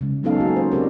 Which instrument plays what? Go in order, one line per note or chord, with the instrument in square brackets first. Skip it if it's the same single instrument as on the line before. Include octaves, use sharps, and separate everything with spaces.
[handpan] C#3 G#3
F#3 B3 C#4 D#4 A4 F5
A#3 F#4 G#4
C5
C4 D4 G4 A#4